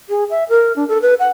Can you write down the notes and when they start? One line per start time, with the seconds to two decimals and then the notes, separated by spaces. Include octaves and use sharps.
0.09 G#4
0.30 E5
0.49 A#4
0.76 D4
0.88 A4
1.02 B4
1.19 F#5